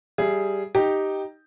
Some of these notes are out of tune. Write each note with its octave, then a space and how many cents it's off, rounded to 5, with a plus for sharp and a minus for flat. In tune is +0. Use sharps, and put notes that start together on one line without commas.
G3 +0 G#4 +0 E5 +20
D#4 +0 G4 +0